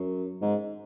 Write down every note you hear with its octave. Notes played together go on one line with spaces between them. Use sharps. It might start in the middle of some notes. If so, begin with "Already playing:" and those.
Already playing: F#2
G#2